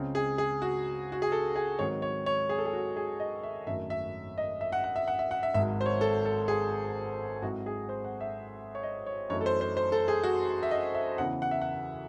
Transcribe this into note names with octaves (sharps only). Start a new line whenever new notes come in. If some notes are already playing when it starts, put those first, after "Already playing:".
Already playing: C#2 C#3 G#3 C4
G#4
G#4
F#4
F#4
G#4
A4
G#4
G#2 D#3 F#3 C4 C#5
C#5
C#5
G#4
A4
G#4
F#4
G#4
D#5
E5
G#1 F#2 D#3 A3 E5
E5
D#5
E5
F#5
F#5
E5
F#5
E5
F#5
E5
G#1 G#2 F#3 E5
C5
C#5
A4
A4
G#4
G#2 F#3 C4 E4 F#4
G#4
C5
F#5
E5
C#5
D#5
C#5
F#2 E3 A3 D#4 C#5
A4
C5
C5
C5
A4
G#4
F#4
E5
D#5
E5
E2 C#3 E3 F#5
F#5
E5
F#5